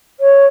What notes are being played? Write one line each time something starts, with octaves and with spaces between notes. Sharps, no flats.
C#5